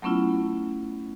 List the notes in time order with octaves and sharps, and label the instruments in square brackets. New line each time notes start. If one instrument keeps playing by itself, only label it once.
[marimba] F#3 A3 B3 C#4 E4 F4